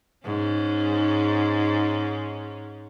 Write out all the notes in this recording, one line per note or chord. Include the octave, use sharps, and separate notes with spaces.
G#2 C#4